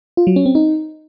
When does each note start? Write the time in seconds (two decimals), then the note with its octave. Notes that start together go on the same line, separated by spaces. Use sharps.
0.17 F4
0.27 F#3
0.36 C#4
0.46 C4
0.55 D#4